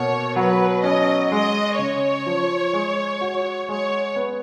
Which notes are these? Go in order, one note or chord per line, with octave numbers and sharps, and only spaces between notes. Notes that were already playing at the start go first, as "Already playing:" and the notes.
Already playing: B2 A#3 C#5
F#3 B4
C#4 D#5
G#3 D#5
C#3 C#5
F3
G#3
F#4
G#3 C#5
B3